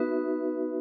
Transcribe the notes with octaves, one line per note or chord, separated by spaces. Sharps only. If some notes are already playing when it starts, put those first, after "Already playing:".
Already playing: B3 D#4 F#4 B4 E5